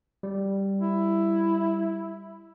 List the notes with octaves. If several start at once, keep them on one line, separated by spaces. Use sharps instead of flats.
G3
E4